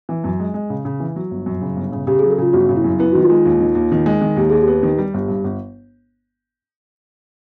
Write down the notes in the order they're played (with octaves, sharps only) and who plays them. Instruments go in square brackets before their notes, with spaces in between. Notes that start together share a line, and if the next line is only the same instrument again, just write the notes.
[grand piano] E3
F#2
G#3
G#3
C#3
C#3
E3
F#3
G1
F#2
C#3
G1
C#3
[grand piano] C#3 [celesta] G4
[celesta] G#4
[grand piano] F#3
[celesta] A4
[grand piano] C#3 [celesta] F4
[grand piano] G1 [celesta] F#4
[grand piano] C#3
[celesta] E4
[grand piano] F#2
[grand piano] B3 [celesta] E4
[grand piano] D#3 [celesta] F#4
[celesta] F4
[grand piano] G#3
D#2
D#3
D#2
D#3
G#3
D#3
[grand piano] D#2 [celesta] G4
[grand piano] D#2 [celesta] G#4
[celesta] G4
[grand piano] B3
D#3
G3
G1
G2
G1